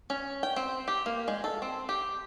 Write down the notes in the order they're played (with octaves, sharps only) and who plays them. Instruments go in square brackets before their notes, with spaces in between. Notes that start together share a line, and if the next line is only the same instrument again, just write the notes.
[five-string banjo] C#4
G5
C4
G4
A#3
G#3
A4
C4
G4